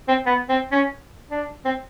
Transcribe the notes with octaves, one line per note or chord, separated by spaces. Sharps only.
C4
B3
C4
C#4
D4
C4